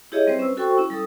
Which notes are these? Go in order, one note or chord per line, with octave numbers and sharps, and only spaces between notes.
E4 G4 G#4 C#5 D#5 E5
G3 C4 B4 C5
C#4 E6
F#4 A4 C5 G5 C#6
C#4 E4 E6
G3 A4 D#6